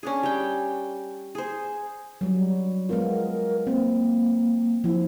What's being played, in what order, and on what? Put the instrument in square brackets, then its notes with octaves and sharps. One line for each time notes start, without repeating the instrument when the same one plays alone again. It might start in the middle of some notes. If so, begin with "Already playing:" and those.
[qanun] C#4 D4 G#4
G3 G5
G#4 C5
[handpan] F#3 G3
[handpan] G#3 B3 F4 [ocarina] A#4
[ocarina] A#4
[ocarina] A#3 [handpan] C4
[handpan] F3 [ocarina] E4